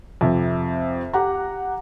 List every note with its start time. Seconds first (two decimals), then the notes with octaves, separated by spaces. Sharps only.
0.21 F2 C3
1.13 G4 F#5 A#5